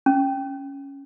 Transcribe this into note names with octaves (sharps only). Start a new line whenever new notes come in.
C#4